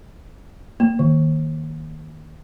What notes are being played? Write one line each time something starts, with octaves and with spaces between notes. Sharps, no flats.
A#3
D#3